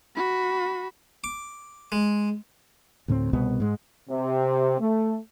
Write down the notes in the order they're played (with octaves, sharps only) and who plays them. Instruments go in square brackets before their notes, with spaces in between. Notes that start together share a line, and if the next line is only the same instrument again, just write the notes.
[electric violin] F#4 B5
[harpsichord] D6
G#3
[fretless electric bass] D2 A2 A#3 C4
C2 B2 B3
G#2 G#3
[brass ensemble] C3
A3